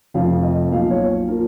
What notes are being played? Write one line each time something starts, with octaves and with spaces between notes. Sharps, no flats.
F1 F2 F3 F5
D#5
B1 A#2 F3 F5
C#5
A#2 F3 A#4